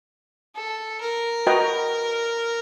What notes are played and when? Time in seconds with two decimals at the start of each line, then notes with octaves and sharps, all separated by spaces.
0.56 A4
1.01 A#4
1.47 F#4 B4 D#5 G5 A#5